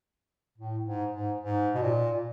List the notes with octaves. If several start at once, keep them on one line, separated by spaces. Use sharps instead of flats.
A2
G#2
G#2
G#2
B2
A#2